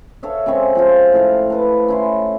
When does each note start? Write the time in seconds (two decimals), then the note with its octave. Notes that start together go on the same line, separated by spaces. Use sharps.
0.23 A4 C#5 E5 F5
0.46 C#3 G#3 C4 C#6
0.75 F3 C4 F4
1.12 A2 A4 F5
1.50 A4 B4 A5
1.88 C#4 E4 C6